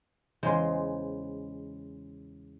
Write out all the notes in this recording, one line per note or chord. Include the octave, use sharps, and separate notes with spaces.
E2 C#3 G#3 C5 G5